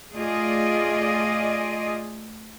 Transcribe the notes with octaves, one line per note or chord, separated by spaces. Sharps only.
A3 F4 G#4 D5 D#5